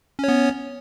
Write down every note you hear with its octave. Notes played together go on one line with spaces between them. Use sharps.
B3 C#4 C#5